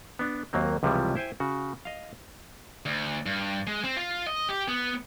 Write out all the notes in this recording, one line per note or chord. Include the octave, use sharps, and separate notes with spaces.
B3 D4
D#2 F#3 A#3 C4
C#2 C3 E3 F3 G3
E4 C5 G5 G#5
C#3 F#4
D#5 F5
D2
G2
G#3
C4
F4
D#5
G4
B3